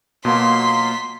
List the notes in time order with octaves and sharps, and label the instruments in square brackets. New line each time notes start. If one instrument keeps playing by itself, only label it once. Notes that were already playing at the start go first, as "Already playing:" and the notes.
[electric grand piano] B2 [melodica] F#3 F4 [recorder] A#3 [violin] C6 B6